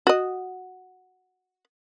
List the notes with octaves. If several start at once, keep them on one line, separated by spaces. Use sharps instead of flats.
F#4 D#5